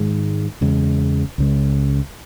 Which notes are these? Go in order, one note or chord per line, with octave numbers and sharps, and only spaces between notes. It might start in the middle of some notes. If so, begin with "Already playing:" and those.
Already playing: G#2 D#3 G#3
E2 C#3 G#3
C#2 C#3 G#3